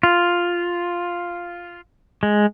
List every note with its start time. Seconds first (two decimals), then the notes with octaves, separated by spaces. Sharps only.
0.03 F4
2.23 G#3